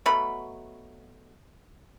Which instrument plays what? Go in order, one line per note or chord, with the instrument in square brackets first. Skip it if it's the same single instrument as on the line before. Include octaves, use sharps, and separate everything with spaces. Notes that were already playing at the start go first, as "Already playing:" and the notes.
[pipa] B2 F#3 A3 B5